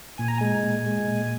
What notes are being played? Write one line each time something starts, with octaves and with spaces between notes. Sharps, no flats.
A#2 G#5
A#5
G#3 G#5
A#2
G#3
A#2